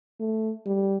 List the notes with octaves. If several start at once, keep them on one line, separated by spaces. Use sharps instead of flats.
A3
G3